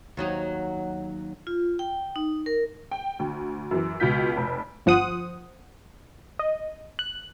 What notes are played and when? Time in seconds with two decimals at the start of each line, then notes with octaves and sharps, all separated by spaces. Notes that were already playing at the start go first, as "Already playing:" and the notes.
0.17 D#2 F#3 D#4
1.47 F4
1.79 G5
2.16 D#4
2.46 A#4
2.91 G5
3.19 D2
3.71 F#2 E3
4.00 C#2 B2 F4 G6 B6
4.37 F1
4.86 G1 F3 C5 F#5 D#6
6.39 D#5
6.99 F#6